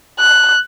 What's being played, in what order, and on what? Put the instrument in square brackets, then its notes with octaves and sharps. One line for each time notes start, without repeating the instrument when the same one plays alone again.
[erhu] F#6